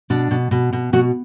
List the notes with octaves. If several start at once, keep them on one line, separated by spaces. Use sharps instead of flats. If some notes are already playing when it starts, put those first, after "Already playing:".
B2 D4
B2
B2
B2
B2 F#4